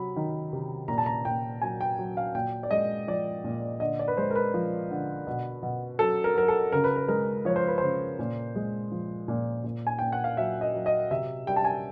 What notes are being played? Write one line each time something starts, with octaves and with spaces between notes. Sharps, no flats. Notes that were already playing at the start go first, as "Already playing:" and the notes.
Already playing: C3 F#3 B5
D#3
C3
A#2 A#5
A5
A#5
A#2 G5
F#3 G#5
G5
F#3
F5
A#2 G5
D5
G#3 D#5
F3 D5
A#2
D3 D#5
D5
B4
G#3 C5
A#4
B4
F3
D3
B2
B2
F#3 A4
A#4
F#3 A#4
A4
C#3 A#4
B4
A#4
G#3 A#4
F3 C#5
C5
B4
C#3 C5
A#2
G#3
F3
A#2
A#2
G#5
A#2 G5
F#5
F5
F#3 E5
D#5
F#3
D#5
C3 E5
G3 G5
A5
G#5